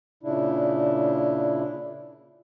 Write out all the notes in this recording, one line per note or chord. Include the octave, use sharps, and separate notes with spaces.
A#2 C#3 D4 E4